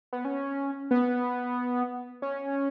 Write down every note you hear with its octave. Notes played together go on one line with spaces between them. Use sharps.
B3
C#4
B3
C#4